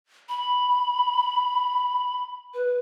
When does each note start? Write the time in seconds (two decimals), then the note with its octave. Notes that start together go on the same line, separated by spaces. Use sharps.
0.29 B5
2.54 B4